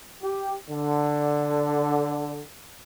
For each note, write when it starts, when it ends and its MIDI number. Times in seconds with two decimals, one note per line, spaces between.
0.22 0.54 67
0.70 2.40 50